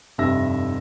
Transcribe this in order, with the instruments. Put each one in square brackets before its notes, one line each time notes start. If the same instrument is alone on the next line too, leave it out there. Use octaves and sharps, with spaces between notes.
[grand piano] F1 G2 C3 E5 E6 A#6